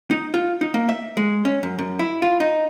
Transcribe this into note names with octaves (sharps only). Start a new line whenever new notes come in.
D#4
F4
D#4
A#3
E5
G#3
C#4
F#2
F#2
E4
F4
D#4